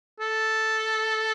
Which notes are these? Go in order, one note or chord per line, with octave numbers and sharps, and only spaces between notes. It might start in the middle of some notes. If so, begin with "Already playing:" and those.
A4